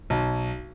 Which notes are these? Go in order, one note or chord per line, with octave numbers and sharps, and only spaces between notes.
B1